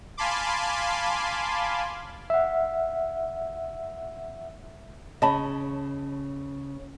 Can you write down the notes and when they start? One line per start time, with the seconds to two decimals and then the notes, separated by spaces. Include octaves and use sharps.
0.17 F5 G#5 A5 B5 C6 D6
2.30 E5 F#5
5.22 C#3 D#5 A5 B5